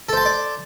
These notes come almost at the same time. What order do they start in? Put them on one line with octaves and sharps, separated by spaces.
A4 C5 A5 C6 D5